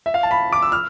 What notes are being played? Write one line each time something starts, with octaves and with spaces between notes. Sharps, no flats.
E5
F5
A5
B5
D6
E6
F6